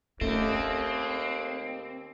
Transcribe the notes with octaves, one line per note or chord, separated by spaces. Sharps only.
D#2 A3 C4 C#4